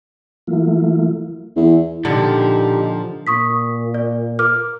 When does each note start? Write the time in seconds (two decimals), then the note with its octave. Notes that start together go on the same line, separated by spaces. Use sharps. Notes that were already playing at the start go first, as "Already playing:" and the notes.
0.47 E3 F#3 A3 A#3 E4 F4
1.56 E2
2.05 A#2 D3 F3 D#4 G4
3.27 A#2 C#6 D#6 B6
3.94 D5
4.39 A#4 D6 F6